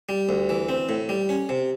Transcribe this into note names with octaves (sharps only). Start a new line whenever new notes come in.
G3
D2
E3
C4
A2
G3
C#4
C3